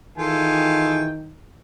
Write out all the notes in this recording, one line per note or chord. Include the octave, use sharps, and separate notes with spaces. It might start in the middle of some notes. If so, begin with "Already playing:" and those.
D#3 E3 F4 G#4 A4 G5 G#5